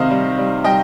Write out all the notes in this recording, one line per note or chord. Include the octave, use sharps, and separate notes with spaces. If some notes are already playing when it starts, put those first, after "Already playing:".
Already playing: C3 D#3 C5 D#5 F5
G3
G3
G3 D#5 G5